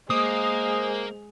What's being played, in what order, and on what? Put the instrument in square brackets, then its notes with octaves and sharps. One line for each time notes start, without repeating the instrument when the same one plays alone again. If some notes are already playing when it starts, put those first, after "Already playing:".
[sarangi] G#3 [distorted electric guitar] A#3 [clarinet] C5 [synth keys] D#6